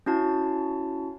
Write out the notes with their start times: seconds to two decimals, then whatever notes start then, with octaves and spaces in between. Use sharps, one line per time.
0.06 C#4 E4 F#4 A5